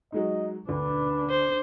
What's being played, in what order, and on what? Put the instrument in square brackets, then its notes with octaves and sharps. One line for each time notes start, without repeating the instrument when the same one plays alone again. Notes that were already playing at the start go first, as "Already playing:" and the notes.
[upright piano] F#3 G#3 D#4 [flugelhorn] D#5
[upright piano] D2 [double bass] D4 [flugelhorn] B4
[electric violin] C5